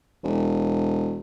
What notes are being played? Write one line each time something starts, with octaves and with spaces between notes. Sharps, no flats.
E1